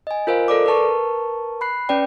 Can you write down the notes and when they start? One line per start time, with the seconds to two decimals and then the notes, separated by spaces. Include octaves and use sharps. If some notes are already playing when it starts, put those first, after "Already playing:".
0.07 D#5 G#5
0.27 F4 A#4 C5 D#5 F5
0.48 A4 A#4 D5 D6
0.66 A#4 B4 A5 C#6
1.61 B5 F#6 C7
1.89 C#4 B4 D5 G5